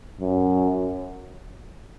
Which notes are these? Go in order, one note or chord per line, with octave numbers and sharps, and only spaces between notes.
F#2